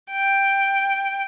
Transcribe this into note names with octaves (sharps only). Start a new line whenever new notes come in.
G5